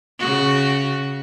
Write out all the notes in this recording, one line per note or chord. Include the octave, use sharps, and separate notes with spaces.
C#3 F#4